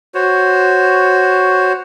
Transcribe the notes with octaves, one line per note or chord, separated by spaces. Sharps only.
F#4 C5 C#5